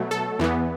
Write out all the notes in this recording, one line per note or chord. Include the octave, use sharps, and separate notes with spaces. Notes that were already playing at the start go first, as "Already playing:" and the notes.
Already playing: B2 F#3 A3
A4
E2 E3 B3